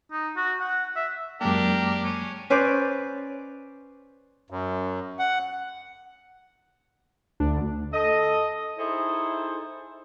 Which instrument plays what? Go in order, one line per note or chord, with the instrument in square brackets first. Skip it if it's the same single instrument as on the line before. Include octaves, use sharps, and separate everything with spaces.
[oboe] D#4
F#4
F#5
E5
[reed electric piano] F#2 G#3 A#3 [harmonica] D4 G4 A#4
[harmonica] C#4
[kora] C#4 B4 C5 D5
[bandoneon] F#2
F#5
[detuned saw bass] D2 [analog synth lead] D4
[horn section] A4 D#5
D#4 E4 G#4 A4 C5